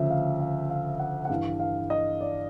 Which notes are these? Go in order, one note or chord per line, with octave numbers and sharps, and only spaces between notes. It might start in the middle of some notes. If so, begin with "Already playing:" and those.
Already playing: D2 C#3 F3 E5
F5
F5
F5
F#5
F#5
G2 E3 F5
F5
D#5
D5